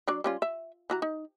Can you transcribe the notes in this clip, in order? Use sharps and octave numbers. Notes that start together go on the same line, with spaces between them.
F#3 D4 D5
G3 C#4 F4
E5
E3 F#4 A#5
D#4